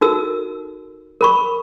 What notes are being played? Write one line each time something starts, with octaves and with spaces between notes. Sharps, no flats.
D#4 F#4 A4 A#4 E6
A#4 B5 C#6